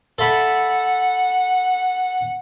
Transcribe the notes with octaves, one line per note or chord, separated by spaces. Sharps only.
A4 E5 F#5 B5